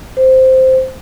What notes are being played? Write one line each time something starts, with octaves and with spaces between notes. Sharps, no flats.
C5